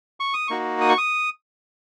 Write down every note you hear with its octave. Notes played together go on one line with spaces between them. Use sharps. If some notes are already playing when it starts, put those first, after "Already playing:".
C#6
D#6
A#3 D#4 F#4 C#6
D#6
C#6
D#6